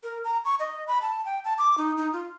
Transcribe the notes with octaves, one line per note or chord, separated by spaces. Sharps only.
A#4
A#5
C#6
D#5
B5
A5
G5
A5
D6
D#4
D#4
F4